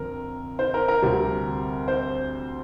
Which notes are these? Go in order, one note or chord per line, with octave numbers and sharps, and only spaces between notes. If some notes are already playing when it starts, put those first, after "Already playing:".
Already playing: F2 D3 C4 A#4
C5
A#4
A#4
D2 C3 G3 C4
C5